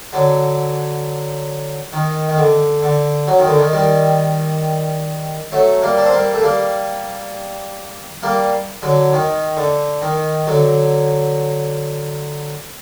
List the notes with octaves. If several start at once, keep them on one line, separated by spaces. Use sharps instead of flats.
D3 F#3
D#3
D#3
D3
D3
F#3
D#3
D3
D#3
D#3 G3
F#3 A3
G3 A#3
D4
C4
G3 A#3
A3
G3 A#3
G3 A#3
D3 F#3
D#3
D3
D#3
D3 F#3